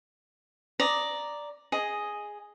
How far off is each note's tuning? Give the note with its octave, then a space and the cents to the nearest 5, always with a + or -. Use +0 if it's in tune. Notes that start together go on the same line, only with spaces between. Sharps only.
D5 +0 A#5 +0 D#6 +5
G#4 +0 D#5 +0